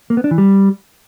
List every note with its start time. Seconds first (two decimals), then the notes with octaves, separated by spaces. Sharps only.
0.10 A#3
0.17 B3
0.24 D4
0.31 E3
0.38 G3